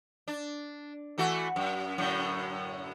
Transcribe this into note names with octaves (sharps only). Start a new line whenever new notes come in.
D4
E3 A3 F#4
F#2
F#2 A2 D3